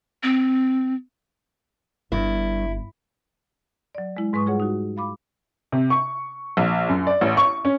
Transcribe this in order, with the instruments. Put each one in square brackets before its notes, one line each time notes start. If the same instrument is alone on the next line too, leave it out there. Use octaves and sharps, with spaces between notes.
[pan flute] C4
[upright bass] G1 [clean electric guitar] G2 [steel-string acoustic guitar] E4
[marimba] F#3 D5
G#3 E4
G#2 G#3 B4 C#6 D#6
G3 F4 G#4 C#5 F#5
D#4 F#4
F5 B5 D6
[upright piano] C3
C#6
A#1
F#2
D5
A1
C#6
C#4